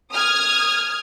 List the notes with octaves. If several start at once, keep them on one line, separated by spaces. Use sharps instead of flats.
D#6 F6 G#6